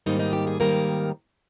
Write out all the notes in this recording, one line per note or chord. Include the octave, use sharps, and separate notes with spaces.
G#2 D#3 G3 A#3 D#4
D#4
G4
G#4
G#2 D#3 G3 A#3 A#4